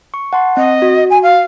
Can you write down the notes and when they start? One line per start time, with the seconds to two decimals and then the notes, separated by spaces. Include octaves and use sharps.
0.14 C#6
0.33 F#5 A5 C6
0.57 C4 D#5
0.82 F#4
1.10 G#5
1.23 F5